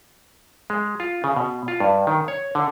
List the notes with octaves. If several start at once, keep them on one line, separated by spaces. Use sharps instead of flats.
G#3
F4
C#3
B2
F4
G2
D#3
C#5
D3